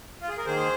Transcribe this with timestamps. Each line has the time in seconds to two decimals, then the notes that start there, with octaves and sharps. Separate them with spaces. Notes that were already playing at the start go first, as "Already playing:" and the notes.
0.21 F4
0.29 G#4
0.38 A#4
0.46 D#3 A#3 G#4 C5